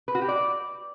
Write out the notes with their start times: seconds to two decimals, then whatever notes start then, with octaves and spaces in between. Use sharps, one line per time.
0.08 B4
0.15 F#4
0.22 G4
0.28 D5